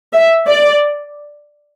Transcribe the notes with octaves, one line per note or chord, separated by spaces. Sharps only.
E5
D5